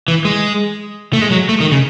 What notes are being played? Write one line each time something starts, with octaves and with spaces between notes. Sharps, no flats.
E3
G#3
A3
G#3
F#3
A3
D#3
C#3